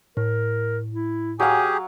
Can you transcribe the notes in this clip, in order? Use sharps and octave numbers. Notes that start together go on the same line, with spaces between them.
A2 A#4
E4
F#3 G4 G#4 F5 G#5